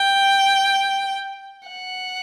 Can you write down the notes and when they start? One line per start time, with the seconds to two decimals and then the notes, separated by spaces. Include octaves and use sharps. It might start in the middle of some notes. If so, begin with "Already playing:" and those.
Already playing: G5
1.68 F#5